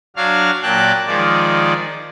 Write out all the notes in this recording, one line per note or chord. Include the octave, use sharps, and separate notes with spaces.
F#3 D4 F#4 F5 F6
A#2 F#3 G5 A5 F#6
D#3 F3 G#3 D5